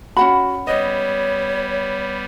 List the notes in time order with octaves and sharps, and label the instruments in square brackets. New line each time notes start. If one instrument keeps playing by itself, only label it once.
[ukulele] C#4 F#5 B5 [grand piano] F#4
[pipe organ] G3 B3 [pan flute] C#5 [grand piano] D#5